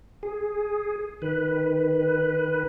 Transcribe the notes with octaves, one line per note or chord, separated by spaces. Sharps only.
G#4
D#3 B4